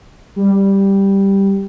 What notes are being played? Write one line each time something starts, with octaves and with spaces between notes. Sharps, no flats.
G3